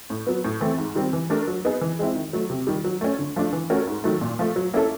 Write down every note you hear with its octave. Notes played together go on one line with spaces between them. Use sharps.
A2
F#3 B3
A2
E3 A3 C4 E4
G#2
D#3 G3 C4
E3
A3 D4 G4 A#4
F#3
B3 D#4 G#4
E3
G#3 C4 E4
D#3
F#3 A3
C3
D#3 G3
F#3
A3 C#4
D3
F3 A3 D4
E3
A3 C#4 F#4 A#4
G#2
D#3 F#3 A3
A#2
F3 A3
F#3
A#3 C#4 E4 A4